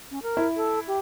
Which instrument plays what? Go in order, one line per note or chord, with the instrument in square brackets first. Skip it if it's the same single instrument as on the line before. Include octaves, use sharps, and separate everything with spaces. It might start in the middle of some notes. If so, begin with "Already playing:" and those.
[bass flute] C#4
A#4
[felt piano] E4
[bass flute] A4
G4